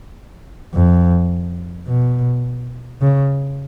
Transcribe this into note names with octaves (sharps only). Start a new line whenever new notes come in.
F2
B2
C#3